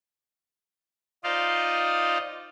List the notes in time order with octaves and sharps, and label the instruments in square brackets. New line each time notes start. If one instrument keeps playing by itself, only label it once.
[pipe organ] D#4 F4 C5 D5 D#5 F5